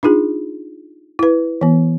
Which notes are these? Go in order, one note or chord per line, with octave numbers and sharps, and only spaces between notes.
D4 D#4 F4 G#4
E4 B4
E3 B3